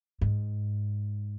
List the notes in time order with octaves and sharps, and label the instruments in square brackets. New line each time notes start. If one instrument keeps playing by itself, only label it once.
[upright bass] G#2